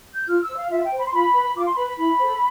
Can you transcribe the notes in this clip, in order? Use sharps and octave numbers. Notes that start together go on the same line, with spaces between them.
G6
F4 F6
E6
C5
F5
F4 E5
G5
C5
B5
C6
F4 B5
B4
F4 D6
C6
B4 B5
B5
E4 B5
A4 C5